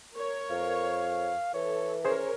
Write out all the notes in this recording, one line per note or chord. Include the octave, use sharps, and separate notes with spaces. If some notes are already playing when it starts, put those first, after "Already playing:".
A#4 C#5
F2 F5
E3 A4 C#5
C#4 G#4 A#4 C5 C#5